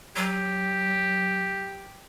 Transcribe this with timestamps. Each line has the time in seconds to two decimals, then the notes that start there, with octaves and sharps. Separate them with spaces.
0.16 F#3 G4